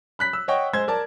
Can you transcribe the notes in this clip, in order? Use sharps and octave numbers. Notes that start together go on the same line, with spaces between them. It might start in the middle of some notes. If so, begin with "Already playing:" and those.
B5 F#6 B6
E6
C#5 D#5 F#5 G5 C#6
G#3 C5 G#6
A#4 D5 A5